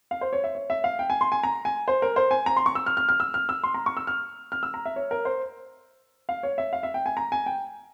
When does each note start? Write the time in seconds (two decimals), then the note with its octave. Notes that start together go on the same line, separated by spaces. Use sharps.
0.11 F5
0.21 C5
0.33 C#5
0.44 E5
0.55 C#5
0.70 E5
0.84 F5
0.99 G5
1.10 G#5
1.21 C6
1.32 G#5
1.43 A#5
1.65 G#5
1.88 C5
2.02 A#4
2.16 C5
2.31 G#5
2.46 A#5
2.57 C6
2.66 C#6
2.75 E6
2.86 F6
2.97 F6
3.09 F6
3.20 E6
3.34 F6
3.49 E6
3.64 C6
3.74 A#5
3.86 C#6
3.97 E6
4.07 F6
4.52 F6
4.63 E6
4.74 A#5
4.86 E5
4.96 C#5
5.11 A#4
5.25 C5
6.29 F5
6.43 C#5
6.58 E5
6.73 F5
6.83 E5
6.94 G5
7.06 G#5
7.17 A#5
7.32 G#5
7.46 G5